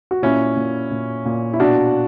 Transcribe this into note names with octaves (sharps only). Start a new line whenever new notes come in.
F#4
A#2 C#4 E4
A#2
A#2
A#2
E4
B2 D4 F#4